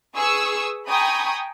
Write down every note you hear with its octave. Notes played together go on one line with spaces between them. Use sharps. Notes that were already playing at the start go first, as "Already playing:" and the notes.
G#4 B4 C#6 D#6 E6
G5 G#5 A#5 B5 C#6 D#6